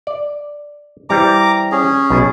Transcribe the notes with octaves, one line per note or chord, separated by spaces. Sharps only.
D5
E3 G3 C4 A#5 D6
C#4 G#4
B1 B2